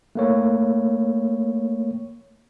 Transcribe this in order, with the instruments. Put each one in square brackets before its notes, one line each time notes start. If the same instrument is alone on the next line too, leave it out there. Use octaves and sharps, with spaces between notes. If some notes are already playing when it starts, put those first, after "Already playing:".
[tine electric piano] A3 A#3 C#5